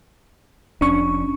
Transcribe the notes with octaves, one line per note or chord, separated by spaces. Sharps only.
F1 F2 C#4 D4 C#6